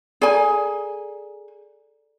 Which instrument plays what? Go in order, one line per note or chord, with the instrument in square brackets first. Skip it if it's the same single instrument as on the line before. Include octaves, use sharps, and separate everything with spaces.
[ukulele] G#4 G#5 [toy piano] A4 D5 A#5